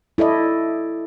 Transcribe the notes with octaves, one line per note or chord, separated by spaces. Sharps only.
E4 A4 D5 D#5